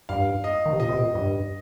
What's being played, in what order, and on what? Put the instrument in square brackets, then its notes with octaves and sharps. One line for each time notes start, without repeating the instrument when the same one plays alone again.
[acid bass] G2 [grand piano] F5
[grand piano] D#5
[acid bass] D#3
C3
[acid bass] A#2 [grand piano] D#5
[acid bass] C3
A#2
G2